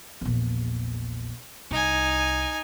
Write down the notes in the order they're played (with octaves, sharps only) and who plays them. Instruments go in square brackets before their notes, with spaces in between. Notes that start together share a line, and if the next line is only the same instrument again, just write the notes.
[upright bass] A#1 E2
[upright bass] C2 [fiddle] D#4 G#5